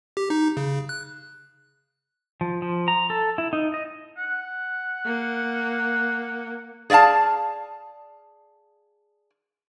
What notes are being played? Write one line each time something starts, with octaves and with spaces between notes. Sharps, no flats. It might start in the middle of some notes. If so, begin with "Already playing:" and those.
G4
D#4
C#3
F#6
F3
F3
A#5
A4
E4
D#4
D#5
F#5
A#3
G#4 D5 E5 F5 A5